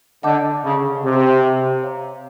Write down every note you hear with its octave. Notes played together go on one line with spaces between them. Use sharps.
D3 D#5 F#5 A5 D6 G6
C#3
C3
C#5 F5 A#5